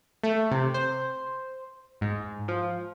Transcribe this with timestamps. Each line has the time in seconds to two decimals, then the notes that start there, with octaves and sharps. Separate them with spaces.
0.23 A3
0.51 C3
0.74 C5
2.01 G#2
2.48 F3